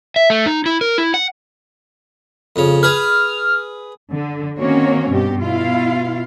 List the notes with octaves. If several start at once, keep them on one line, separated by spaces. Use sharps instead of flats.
E5
A3
D#4
E4
A#4
E4
F#5
F2 C#3
G#4 B4 F6
D3
D#3 A#3 C4 C#4 F#4 C#5
G2 B2 G4
B2 E4 F4 F5